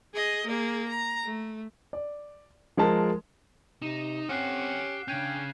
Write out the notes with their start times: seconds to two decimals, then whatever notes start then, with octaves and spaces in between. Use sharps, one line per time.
0.14 G#4 D#5
0.46 A#3 G#4
0.88 A#5
1.24 A3
1.93 D5
2.77 F3 G#3 A#4 A5
3.82 C3 D#4 E7
4.29 C4 C#4 G4 F#5 F6 F#6 C7
5.08 C#3 C#4 D4 G5 G6 G#6